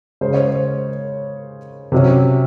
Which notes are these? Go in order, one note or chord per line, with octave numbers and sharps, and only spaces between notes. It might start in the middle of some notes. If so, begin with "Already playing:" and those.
C#3 G#3 C#4 C5
C#5
C5
C3 F#3 C#4